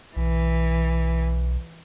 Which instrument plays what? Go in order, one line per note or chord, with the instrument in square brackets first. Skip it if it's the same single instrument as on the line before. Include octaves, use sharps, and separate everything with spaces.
[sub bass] B1 [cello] E3